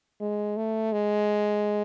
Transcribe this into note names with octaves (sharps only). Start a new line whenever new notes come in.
G#3
A3
G#3